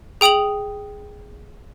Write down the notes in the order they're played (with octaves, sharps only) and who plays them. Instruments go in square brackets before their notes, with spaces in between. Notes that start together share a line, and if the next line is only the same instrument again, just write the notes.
[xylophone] G#4 G5 D#6 F7 F#7